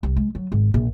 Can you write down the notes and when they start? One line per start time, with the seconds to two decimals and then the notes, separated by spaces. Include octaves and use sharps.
0.03 C2
0.17 G#3
0.35 F#3
0.52 G#1
0.74 A#1